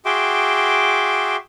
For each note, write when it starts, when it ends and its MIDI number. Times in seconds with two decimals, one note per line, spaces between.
0.05 1.36 66
0.05 1.36 68
0.05 1.36 76
0.05 1.36 79
0.05 1.36 84
0.05 1.36 86